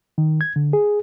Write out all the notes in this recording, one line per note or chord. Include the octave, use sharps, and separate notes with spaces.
D#3
G#6
D3
G#4